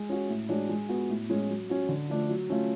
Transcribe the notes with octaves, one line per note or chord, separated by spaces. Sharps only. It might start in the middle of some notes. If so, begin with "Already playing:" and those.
Already playing: G#3
C#4 F#4
A2
G#3 D4 F#4 C#5
G#3
B3 F#4
A2
G#3 C#4
F#3
C#4 F#4
D3
F3 A3 D4
F#3
A3 C#4 F4